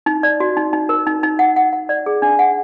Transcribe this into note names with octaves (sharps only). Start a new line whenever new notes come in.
D#4
D5
F#4
D#4
D#4
A#4
D#4
D#4
F#5
F#5
F#5
D5
G#4
D4
F#5